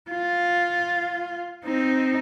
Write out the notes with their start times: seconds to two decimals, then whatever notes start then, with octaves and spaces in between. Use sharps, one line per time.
0.11 F4
1.65 C4 D#4